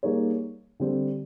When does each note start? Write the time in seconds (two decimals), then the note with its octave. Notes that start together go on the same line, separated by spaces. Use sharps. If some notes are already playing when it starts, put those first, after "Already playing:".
0.03 G3 A#3 D#4 G#4 C#5
0.80 D3 G3 C4